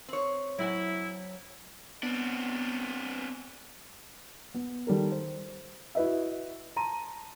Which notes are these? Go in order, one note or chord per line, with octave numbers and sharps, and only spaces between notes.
C4 C#5
F#3 E4 G#5
B3 C4 D4
B3
D#3 G3 A4 A#4
C5
E4 F#4 B4 D#5 E5
A5 A#5 C6 D#7